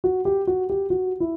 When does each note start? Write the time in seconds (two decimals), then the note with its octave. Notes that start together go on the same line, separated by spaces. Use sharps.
0.04 F#4
0.25 G4
0.47 F#4
0.69 G4
0.90 F#4
1.20 E4